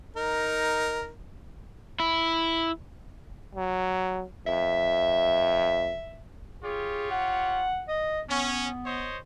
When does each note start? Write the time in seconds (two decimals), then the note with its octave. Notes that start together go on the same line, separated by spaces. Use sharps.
0.16 D#4 A#4
2.00 E4
3.55 F#3
4.46 F2 E5
6.63 F4 G4 G#4 C#5
7.11 F#5
7.88 D#5
8.29 B3 C#4
8.86 C5 C#5 D#5